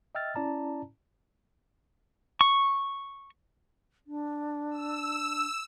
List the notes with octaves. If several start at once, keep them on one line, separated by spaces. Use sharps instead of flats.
D#5 E5 G5 E6 F6 A6
C#4 E4 D5 A5 A#5
C#6
D4
E6